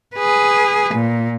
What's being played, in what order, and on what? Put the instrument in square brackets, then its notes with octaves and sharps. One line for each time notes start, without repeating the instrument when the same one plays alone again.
[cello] G#4 B4
A#2